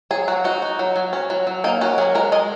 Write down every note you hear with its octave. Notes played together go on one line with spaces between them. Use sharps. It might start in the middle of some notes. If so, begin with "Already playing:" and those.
F#3 G#4
F#3 F#4
D#4 F#4
D#4
F#3
F#3
C#4
F#3
F#3
A#3 D#4
C#4 F#4
F#3 G#4
G#3 A#4
G#3 D#5